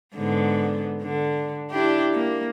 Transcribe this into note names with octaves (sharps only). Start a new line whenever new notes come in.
G#2 D3 B3
D3
D4 E4 G4
A#3